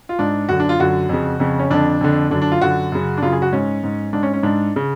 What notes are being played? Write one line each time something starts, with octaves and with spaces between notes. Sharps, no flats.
F4
G#2 D4
F#2 D3 F#4
D4
F4
F#2 D3 F#4
F2 C#3
F2 C#3
C#4
F2 D3 D4
F2 D3
F#2 D3 D4
D4
F4
F#2 D3 F#4
F#2 C#3
D4
F#2 C#3 F4
G#4
F#4
G#2 C#4
G#2
G#2 D4
C#4
C#4
G#2 D4
C#3